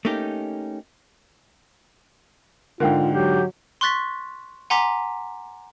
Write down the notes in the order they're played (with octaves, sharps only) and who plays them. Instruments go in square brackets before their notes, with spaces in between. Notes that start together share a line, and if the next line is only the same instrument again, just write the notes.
[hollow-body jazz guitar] A3 A#3 C#4 D#4 G4
[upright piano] G#2 D3 [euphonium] F4 [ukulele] A#4 F5 G5
[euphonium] F#3 [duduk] G4
[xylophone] C6 C#6 F#6 A6 B6
F#5 G#5 A#5 C6 D6 B6